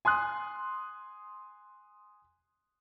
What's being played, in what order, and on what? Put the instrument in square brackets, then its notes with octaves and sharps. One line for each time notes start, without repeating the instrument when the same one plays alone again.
[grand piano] G#5 C6 D#6 F#6